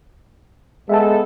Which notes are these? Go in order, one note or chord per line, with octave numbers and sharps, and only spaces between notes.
G#3 B3 A4 E5 A5